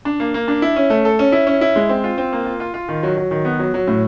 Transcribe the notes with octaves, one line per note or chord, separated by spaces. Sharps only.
D4
A#3
A#3
D4
E4
C#4
A3
A4
C#4
E4
C#4
E4
G#3
C4
F4
C4
A#3
F4
F4
F4
D#3
F#3
F#3
D#3
B3
F#3
F#3
A2